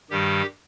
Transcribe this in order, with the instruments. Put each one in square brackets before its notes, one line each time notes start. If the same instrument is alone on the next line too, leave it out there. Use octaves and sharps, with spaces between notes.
[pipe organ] G2 D#3 G3 G4